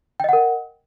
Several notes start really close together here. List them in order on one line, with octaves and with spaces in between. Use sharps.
G5 D#5 F#5 A#4